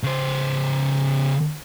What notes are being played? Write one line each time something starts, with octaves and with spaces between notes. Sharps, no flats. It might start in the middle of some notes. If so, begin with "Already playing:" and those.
C#3 C5